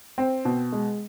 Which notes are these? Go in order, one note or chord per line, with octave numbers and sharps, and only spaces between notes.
C4
B2
G#3